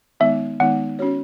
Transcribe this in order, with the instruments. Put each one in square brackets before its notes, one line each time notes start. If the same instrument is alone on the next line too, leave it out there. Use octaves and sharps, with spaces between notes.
[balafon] D#3 G#3 B3 D#4 [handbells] E5
[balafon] D#3 G#3 B3 D#4 [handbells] F#5
[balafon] C#4 F#4 C#5